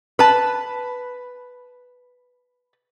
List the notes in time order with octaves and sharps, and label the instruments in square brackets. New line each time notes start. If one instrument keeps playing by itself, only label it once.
[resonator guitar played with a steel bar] B4 A5